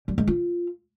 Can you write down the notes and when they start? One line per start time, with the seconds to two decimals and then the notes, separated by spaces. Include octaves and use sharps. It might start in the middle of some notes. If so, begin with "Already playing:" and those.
0.08 G3
0.18 G#3
0.28 F4